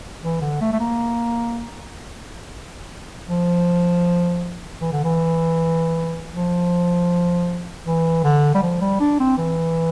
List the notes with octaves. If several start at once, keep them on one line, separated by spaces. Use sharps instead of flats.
E3
D3
A3
A3
A#3
F3
E3
D3
E3
F3
E3
D3
G3
F3
G3
D4
C4
E3